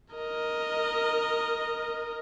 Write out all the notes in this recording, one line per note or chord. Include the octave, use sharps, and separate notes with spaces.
A#4 D#5